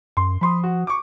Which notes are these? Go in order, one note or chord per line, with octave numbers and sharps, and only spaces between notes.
F#2 C6
F3 B5 C6 D#6
F#4
C#6 D6